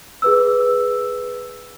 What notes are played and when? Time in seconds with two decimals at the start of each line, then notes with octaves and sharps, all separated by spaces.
0.22 G#4 B4 E6